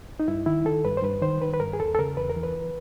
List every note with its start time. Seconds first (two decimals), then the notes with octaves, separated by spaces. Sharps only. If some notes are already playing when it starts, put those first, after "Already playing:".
0.20 D#4
0.28 G2 E4
0.46 D#3 E4
0.65 D#3 A4
0.85 G2 B4
0.97 C5
1.03 G2 B4
1.22 D#3 C5
1.42 D#3 B4
1.54 B4
1.60 G2 A#4
1.73 G#4
1.80 E2 A4
1.95 A4
1.99 C#3 A#4
2.17 E2 B4
2.29 A#4
2.36 E3
2.43 B4